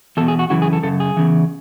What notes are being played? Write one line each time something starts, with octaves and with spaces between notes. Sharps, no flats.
E2 B2 A4
G#4
F#4
F#2 C#3 E3 F#4
G#4
A4
F#2 C#3 A4
G#4
E2 C#3 E3